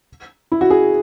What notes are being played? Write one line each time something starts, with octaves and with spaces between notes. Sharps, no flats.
E4
F#4
G#4